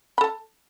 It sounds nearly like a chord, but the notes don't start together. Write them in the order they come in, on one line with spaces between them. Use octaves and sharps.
B5 A4 A5